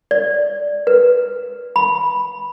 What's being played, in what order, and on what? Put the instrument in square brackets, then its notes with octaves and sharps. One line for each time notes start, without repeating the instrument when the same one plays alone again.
[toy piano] D5
B4
B5